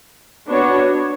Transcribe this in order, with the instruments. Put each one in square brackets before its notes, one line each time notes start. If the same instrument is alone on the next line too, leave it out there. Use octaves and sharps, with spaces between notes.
[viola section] B3 D4 F#4 C#5